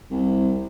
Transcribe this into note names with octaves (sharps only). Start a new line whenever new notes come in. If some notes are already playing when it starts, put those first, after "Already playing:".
C2